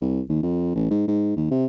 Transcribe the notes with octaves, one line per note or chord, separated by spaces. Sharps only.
C2
D#2
F2
A1
G#2
G#2
D#2
C3